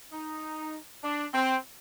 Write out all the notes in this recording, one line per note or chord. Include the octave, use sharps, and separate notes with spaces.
D#4
D4
C4